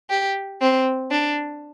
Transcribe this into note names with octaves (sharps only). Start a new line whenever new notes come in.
G4
C4
D4